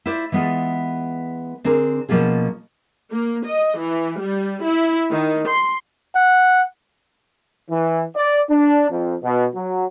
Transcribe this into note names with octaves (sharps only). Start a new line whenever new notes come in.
E4 F4 C5 D5
E3 G#3 B3 F4 A4
D3 C4 D4 G#4 A#4
B2 F3 A#3 C#4 F4 G#4
A#3
D#5
E3
G3
E4
D#3
C6
F#5
E3
D5
D4
F2
B2
F#3